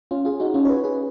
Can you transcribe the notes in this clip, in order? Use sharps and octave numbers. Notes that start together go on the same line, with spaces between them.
C#4 F4
F4 G#4
D#4 F#4
C#4 F4
C#5
G#4 B4
G#4 B4